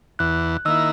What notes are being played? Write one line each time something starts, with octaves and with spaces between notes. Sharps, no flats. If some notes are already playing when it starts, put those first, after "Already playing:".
E2 F#6
D#3 A#3 E4 E6